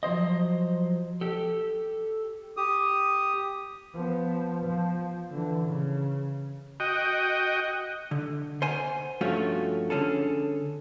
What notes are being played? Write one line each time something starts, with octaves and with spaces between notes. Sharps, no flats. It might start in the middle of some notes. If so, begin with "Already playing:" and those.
F3 F#3 C5 D#5
G4 A4
G4 D#6
F3 B3
F3
D3 E3
C#3
F#4 D#5 G5
D3
C5 F#5 G#5
G2 F3 A3 C#4 F4 F#4
D3 C#4 G#4 A4